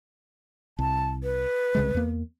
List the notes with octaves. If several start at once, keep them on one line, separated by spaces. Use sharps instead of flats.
C2 A5
B4
C2 C#3 G#3
E2 A#3